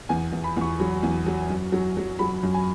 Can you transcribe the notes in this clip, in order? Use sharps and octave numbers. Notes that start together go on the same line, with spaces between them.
E2 G#5
E2
B5
E2 C#6
F#3
E2
F#3
F#2
F#3
F#3
F#3 B5
F#2
G#5